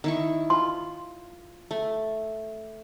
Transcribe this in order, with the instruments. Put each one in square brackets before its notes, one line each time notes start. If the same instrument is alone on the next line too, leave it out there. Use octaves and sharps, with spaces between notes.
[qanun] D#3 E4 C#6
[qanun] F4 [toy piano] C6
[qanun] A3